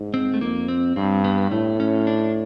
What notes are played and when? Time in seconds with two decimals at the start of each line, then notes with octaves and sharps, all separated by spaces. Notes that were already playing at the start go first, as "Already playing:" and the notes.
Already playing: G#2
0.14 C4
0.34 A3
0.41 F2 A#3
0.68 C4
0.96 G2 C4
1.24 B3
1.51 A2 A3
1.80 C#4
2.07 D4